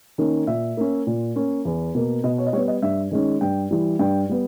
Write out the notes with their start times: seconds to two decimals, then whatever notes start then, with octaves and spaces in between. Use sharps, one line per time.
0.18 D#3 A#3 C#4
0.47 A#2 E5
0.77 A#3 C#4
1.07 A#2
1.36 A#3 C#4
1.65 E2
1.95 B2 A#3
2.24 B2 D#5
2.38 C#5
2.47 D#5
2.53 G3 C#5
2.57 B3
2.68 D#5
2.82 G2 E5
3.11 D#3 G#3 C#4
3.41 G2 G5
3.71 E3 G3
3.99 G2 G5
4.29 G3 B3